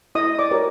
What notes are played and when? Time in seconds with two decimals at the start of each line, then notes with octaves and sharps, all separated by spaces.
0.15 E4 D#5 D#6
0.39 D5 D6
0.51 G4 A#4 C#5